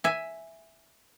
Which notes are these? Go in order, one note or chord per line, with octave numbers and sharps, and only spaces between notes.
E5 G#5